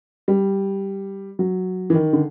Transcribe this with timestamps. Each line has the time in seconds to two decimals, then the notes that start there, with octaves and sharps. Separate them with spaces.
0.28 G3
1.39 F#3
1.90 E3
1.94 D#3
2.13 D3